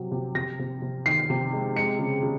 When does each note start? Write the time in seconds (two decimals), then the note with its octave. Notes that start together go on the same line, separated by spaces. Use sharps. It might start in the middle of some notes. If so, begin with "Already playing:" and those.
Already playing: C3 F#3
0.11 C3
0.35 C3 A#6
0.59 C3
0.82 C3
1.06 D#3 C7
1.30 C3
1.53 G#3
1.76 G#3 C#7
1.99 C#3
2.23 C#3